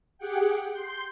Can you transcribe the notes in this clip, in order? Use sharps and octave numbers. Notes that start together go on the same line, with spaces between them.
G4 G#4 F#5 G5
C6 G6